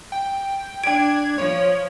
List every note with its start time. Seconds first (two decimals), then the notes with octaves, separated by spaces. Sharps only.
0.12 G5
0.84 D4 G5 G#6 D7
1.38 F3 C#5